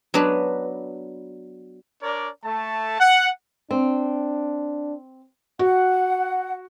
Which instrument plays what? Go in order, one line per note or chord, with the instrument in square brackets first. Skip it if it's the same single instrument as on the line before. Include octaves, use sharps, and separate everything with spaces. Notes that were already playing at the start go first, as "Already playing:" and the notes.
[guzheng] F#3 B3 D4 B4
[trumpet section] D4 A#4 C#5 D5
A3 A5
F#5
[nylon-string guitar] C4 [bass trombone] D4
[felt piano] F#4 [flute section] F#5